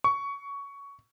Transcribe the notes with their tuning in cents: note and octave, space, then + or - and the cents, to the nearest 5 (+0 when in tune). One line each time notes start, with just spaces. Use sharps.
C#6 +15